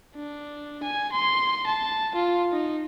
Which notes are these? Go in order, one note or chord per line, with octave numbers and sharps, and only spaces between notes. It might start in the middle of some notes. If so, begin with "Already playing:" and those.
D4
G#5
C6
A5
F4
D#4